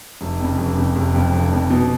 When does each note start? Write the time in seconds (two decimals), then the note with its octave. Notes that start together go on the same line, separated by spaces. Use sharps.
0.21 F1
0.40 F2 C#3
0.58 F1
0.77 F2 C#3
0.96 F1
1.14 F2 C#3
1.33 F1
1.52 F2 C#3
1.70 B2